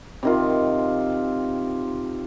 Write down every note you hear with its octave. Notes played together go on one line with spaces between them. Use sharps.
C3 D#3 F4